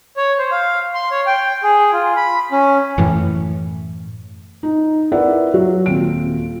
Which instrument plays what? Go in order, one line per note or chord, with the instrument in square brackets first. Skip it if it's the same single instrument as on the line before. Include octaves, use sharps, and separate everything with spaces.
[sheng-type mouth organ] C#5
C5
F5
C6
C#5
G5
G#4
F4
B5
C#4
[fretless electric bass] F#2 A2 E3
[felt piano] D#4
E4 A#4 B4 D5 E5 F#5
F#3 F4 F#4
D#1 C4 F4 D7